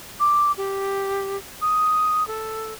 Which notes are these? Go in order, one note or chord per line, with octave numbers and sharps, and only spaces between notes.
D6
G4
D#6
A4